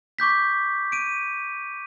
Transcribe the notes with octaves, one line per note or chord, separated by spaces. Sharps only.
C#6 D6 G6 B6
D7 D#7